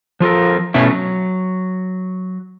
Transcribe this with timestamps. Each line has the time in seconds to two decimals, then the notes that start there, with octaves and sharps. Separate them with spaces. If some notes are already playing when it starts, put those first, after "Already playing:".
0.20 F3 F4 A4 A#4
0.74 B2 A3 C#4 E4
0.90 F#3